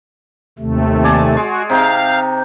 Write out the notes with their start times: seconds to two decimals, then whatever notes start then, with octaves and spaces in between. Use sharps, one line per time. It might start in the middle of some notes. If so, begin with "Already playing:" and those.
0.59 D#2 C3 A3
1.04 D5 G#5 A5
1.37 G#3 F#4
1.70 C3 D#4 F5 G5